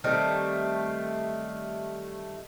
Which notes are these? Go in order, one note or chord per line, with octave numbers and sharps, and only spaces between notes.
D#3 G3 A3 C4